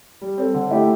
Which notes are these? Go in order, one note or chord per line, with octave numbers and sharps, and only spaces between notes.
G3
C4 A4
D3
A3 E4 G4